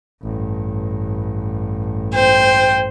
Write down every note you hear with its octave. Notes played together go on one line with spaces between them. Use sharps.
A1 G2
C5 G5